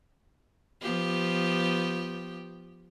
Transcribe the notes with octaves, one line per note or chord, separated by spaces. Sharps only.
F3 B3 G4